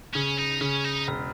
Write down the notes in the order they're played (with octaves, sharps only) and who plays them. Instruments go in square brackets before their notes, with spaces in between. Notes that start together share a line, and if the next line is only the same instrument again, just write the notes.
[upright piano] C#3 [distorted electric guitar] C#4
[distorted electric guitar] D#4
[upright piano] C#3 [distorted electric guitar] C#4
[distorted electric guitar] D#4
[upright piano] E1